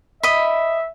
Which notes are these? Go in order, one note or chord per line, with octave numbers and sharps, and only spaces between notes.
D#5 E5 B5